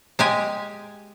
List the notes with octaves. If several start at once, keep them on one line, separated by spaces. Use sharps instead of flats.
G#3 G4 G#5